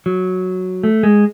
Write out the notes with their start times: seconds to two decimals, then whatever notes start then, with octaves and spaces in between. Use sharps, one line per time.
0.06 F#3
0.84 A3
1.03 G#3